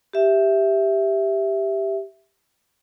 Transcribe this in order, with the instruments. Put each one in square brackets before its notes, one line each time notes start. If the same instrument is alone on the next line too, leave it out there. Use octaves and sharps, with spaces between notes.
[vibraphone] G4 E5